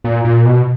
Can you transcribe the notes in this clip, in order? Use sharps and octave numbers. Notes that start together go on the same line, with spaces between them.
A#2
A#2
B2